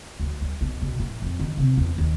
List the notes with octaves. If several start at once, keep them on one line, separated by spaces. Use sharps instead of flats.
D2
G3
B1
B2
A2
F2
D#3
C3
E2
D#2